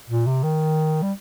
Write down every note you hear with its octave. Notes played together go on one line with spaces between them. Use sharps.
A#2
C3
D#3
G3